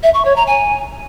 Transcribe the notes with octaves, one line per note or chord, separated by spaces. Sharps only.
E5
C#6
C#5
A#5
G#5